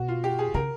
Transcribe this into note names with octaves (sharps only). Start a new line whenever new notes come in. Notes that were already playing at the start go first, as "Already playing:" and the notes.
Already playing: B2 F#4
F4
G4
G#4
C#3 A#4